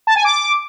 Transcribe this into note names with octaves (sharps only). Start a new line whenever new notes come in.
A5
G#5
D6